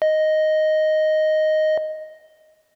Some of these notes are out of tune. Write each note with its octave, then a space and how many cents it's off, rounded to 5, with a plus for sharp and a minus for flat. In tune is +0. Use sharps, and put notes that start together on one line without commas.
D#5 +0